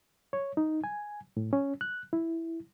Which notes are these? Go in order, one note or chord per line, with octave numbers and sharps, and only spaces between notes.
C#5
D#4
G#5
A2
C#4
F#6
E4